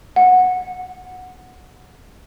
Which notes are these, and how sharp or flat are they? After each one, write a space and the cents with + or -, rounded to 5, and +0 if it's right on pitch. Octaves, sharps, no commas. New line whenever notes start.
F#5 -15